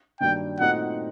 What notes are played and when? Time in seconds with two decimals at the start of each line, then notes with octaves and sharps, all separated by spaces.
0.21 G2 D#3 F#3 A#3 D4 G5
0.59 A#2 A3 C4 D#4 F#4 F#5